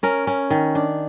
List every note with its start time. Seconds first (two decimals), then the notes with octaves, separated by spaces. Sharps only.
0.03 C#4 A#4
0.27 C#4
0.50 D#3
0.75 D4